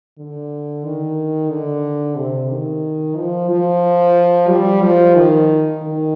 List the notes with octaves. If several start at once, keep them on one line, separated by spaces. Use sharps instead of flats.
D3
D#3
D3
C3
D#3
F3
F3
G3
F3
D#3
D#3